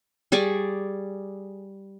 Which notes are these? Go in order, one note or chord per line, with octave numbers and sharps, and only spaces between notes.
G3 G#4 D5 C#6